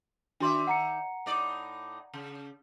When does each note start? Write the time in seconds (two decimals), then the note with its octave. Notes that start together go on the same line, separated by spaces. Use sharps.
0.40 D#3 D4 F#4 D5 E5 C6
0.67 F#5 A#5 C#7
1.26 A2 D#4 D5
2.14 C#3